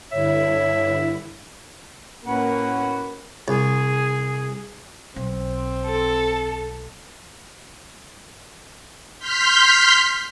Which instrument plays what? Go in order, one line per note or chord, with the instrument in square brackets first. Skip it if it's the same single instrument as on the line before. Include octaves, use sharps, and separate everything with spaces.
[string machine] G2 D3 E4 [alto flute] C#5 [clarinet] E5
[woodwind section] A2 C#4 F#5 [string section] A#3 [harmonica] F#4 B4
[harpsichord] C2 [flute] G#4
[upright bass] B1 [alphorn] C4
[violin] A4
[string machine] C6 F6 G6 B6